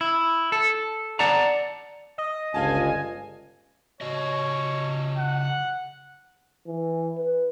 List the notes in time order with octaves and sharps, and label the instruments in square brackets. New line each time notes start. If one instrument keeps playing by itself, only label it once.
[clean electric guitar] E4
A4
D5 F#5 A5 A#5
[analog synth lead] D#5
[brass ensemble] G1 C#2 G#5 [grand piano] F4 F5 A5
[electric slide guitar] C#3 F#4 D#5 [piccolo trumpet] C#5
[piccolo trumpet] F#5
[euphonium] E3
B4